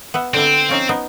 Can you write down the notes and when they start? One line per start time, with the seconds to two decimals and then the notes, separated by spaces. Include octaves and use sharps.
0.14 B3 E5 F#5
0.34 D3 C4 D4 E4
0.69 F3 C#4 D#4
0.89 B3 D#4